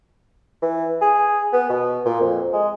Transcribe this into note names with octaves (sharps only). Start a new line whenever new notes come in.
E3
G#4
B3
B2
A#2
F2
G#3